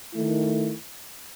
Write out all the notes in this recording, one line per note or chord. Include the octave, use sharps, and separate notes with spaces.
D#3 A3 E4